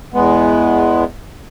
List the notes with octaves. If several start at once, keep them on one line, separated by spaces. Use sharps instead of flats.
E2 G#3 B3